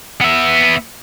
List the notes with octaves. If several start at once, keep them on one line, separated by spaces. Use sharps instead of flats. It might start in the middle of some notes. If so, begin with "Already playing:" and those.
B3 E5